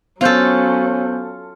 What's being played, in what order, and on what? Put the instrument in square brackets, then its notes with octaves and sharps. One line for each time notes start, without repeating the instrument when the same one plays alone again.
[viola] F#3 C#4 [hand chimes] B3 C5 G6 [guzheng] F4 A4